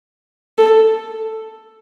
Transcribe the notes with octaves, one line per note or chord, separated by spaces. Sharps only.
A4